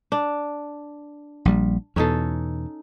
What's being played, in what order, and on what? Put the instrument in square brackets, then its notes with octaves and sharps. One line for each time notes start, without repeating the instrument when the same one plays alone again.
[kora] D4
[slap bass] A#1 G3
[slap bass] E2 B2 [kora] C#4 D#4 A4